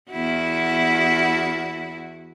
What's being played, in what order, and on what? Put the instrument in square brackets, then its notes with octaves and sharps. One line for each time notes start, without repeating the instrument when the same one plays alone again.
[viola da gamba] E2 E4 F#4